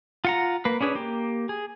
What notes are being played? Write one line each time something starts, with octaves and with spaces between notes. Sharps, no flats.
F4 F#5 A#5
A#3 B4
C#4 D4 G#4 B4
A#3 G4
G#4